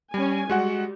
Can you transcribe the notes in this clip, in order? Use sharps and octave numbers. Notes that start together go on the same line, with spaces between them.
G3 C#4 G#5
G3 G#3 F#4 F#5